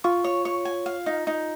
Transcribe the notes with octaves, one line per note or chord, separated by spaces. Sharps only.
F4 C#6
C#5
C#5
G#5
F5
D#4
D#4